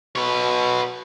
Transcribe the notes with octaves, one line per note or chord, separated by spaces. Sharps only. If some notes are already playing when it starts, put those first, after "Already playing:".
B2 B4 C#5